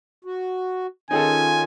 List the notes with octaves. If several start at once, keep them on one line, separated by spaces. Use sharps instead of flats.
F#4
D#3 C#4 D#4 F4 G#4 A4 G#5